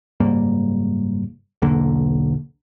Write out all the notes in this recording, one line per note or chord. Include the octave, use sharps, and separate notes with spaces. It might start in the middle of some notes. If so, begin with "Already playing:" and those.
F#1 G#2 G3 A#3
B1 E2 D3 A#3